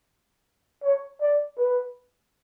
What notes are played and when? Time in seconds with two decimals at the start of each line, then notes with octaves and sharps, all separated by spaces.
0.83 C#5
1.21 D5
1.58 B4